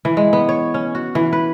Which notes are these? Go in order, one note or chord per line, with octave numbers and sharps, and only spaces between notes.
E3
G#3
B3
C#5
C#4
F#4
E3
B4